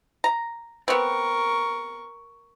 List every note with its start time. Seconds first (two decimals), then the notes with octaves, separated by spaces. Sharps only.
0.24 A#5
0.88 B3 C4 A#4 C#6